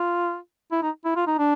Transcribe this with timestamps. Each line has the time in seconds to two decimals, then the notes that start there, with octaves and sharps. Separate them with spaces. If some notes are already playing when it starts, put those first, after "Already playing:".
Already playing: F4
0.71 E4
0.82 D#4
1.05 E4
1.16 F4
1.27 D#4
1.38 D4